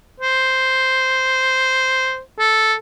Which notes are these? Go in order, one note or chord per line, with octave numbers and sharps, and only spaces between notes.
C5
A4